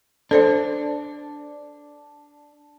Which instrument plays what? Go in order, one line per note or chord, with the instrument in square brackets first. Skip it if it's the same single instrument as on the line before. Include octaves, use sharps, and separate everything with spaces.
[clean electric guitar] D4 [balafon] A4 C5 D5